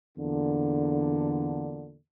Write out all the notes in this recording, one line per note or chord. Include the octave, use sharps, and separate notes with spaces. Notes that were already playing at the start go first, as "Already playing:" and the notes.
E2 A#2 D3